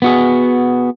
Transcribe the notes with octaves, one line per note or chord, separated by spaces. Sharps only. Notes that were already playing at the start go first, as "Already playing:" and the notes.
B3 F#4 G#4